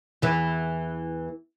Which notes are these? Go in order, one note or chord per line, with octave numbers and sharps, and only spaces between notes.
E2 E3